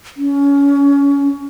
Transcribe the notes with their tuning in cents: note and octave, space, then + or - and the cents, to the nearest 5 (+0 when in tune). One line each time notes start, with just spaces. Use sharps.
C#4 +25